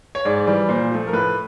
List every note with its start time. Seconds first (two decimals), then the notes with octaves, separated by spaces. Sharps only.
0.15 C#5
0.25 G#2 D5
0.47 E3 G3
0.69 A#2 C5
0.91 F3 A3
1.07 A#4
1.13 A2 B4